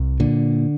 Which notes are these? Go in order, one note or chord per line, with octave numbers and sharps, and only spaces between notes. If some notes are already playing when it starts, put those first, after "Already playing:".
Already playing: C2
A#2 D3